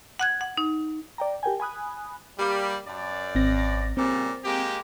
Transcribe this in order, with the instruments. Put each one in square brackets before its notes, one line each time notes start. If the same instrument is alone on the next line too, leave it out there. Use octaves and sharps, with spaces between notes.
[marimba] F#5 F#6 G#6
F#5
D#4
[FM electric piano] D5 G5 A#5
G4 A#4 G5 G#5
G#5 B5 D#6 F#6
[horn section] G3 A#3
F#2 D5
[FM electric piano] G#1 C4 A#6
[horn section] A#2 C#3 G3 [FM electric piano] C4
[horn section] G#3 A#3 G4